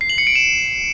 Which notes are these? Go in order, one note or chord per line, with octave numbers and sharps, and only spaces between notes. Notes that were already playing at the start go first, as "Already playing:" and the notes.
C7
F#7
C#7
D7
E7